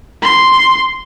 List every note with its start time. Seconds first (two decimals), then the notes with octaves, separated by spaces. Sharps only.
0.22 C6